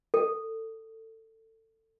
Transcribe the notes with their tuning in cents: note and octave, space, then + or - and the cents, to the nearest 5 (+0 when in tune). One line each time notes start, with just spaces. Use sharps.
A4 +25